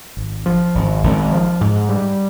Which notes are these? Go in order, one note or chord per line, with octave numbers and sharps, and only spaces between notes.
G#1
F3
G#1
G#1
F3
G#2
G3